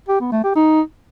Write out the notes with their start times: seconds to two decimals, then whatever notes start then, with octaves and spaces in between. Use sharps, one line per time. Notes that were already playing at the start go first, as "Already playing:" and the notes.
0.09 G4
0.20 B3
0.32 A3
0.44 G4
0.56 D#4